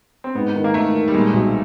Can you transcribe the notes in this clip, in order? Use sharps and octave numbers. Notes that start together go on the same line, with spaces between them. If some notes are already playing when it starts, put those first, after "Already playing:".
C4
G#2 B3
D#3
A#3
D#3 A3
D#3
G3
A#2 G#3
B1